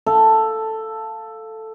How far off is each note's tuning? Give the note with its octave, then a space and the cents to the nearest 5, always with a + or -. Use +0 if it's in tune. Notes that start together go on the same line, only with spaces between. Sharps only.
A4 +5 F5 +0